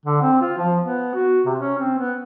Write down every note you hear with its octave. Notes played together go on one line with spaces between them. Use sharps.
D3
C4
F4
F3
B3
F#4
C3
C#4
C4
B3